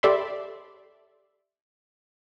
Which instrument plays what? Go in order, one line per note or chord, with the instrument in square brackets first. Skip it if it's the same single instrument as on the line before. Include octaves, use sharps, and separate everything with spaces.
[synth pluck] G4 A4 D5 E5 B5 C6